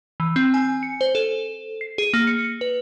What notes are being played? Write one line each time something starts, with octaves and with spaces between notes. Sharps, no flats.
E3
C4
G#5
C#7
C5
A4
C7
G#4
A#3
C#7
B4